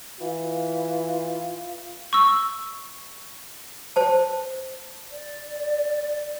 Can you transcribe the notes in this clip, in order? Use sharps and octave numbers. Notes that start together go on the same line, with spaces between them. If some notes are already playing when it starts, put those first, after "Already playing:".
E3 F4
C#6 E6
C5 A5
D5